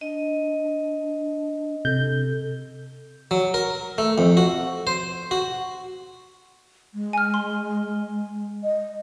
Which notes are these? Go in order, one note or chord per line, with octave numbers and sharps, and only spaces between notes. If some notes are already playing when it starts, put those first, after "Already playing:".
D4 D#5
C3 A4 G6
F#3
A#4
A3
F2
F#4
C5
F#4
G#3
G#5 F6
C6
D#5